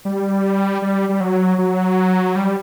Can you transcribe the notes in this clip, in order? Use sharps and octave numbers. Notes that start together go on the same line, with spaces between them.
G3
G3
G3
F#3
F#3
G3